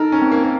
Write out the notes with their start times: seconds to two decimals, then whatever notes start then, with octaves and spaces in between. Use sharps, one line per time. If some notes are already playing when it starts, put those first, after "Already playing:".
Already playing: D#4 A4 A#4
0.12 C#4
0.22 C4
0.32 A#3
0.43 A#3